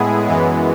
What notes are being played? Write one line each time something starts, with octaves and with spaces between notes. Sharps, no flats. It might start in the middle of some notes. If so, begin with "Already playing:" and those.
Already playing: A2 G#3 B3 E4 G#4
F#2 E3 G#3 B3